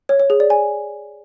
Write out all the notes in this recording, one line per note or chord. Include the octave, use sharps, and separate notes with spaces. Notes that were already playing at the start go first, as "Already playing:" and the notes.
C#5
C#5
G#4
D5
G#5